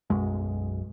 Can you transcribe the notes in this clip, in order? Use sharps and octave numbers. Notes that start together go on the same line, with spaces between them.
B1 F#2 G#3